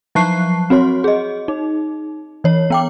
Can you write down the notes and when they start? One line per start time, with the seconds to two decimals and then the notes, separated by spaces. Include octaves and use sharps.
0.15 F3 F#3 A5 C#6 F#6 C7
0.70 C4 F#4 C#5 C6
1.04 G#4 D#5
1.48 D#4
2.44 E3 C#5
2.70 B3 G5 D6